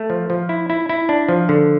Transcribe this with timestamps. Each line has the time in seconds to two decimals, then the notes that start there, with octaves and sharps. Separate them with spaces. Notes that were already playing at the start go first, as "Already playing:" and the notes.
Already playing: A3
0.10 F3
0.30 F3
0.49 E4
0.70 E4
0.89 E4
1.09 D4
1.29 F3
1.49 D3